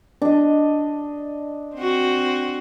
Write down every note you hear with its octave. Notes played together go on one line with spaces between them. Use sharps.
D4 D#5
C4 F#4